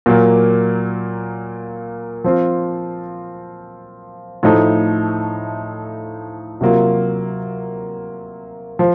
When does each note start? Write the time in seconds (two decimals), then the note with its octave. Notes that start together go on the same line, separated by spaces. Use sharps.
0.06 A#2 F#3 A#3
2.24 F3 C4 F4
4.43 A2 F3 A3 D#4
6.61 C3 F#3 A#3 F4
8.79 F3